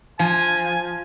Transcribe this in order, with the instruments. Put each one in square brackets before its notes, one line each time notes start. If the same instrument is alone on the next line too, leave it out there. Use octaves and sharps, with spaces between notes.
[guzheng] F3 [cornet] G#5